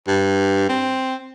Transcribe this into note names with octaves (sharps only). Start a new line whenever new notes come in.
G2
C4